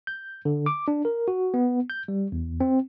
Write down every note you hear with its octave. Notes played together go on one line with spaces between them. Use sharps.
G6
D3
D6
D4
A#4
F#4
B3
G6
G3
E2
C4